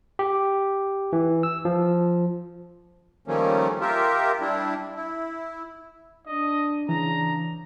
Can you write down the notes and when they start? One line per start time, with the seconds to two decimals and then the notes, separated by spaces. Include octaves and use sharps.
0.19 G4
1.13 E3
1.43 E6
1.65 F3
3.28 D#3 F3 G3 A3 A#3 C#4
3.81 F4 G4 A#4 E5
4.41 G3 D4 E4
4.96 E4
6.27 D4 D#5
6.89 C#3 E3 D4 A#5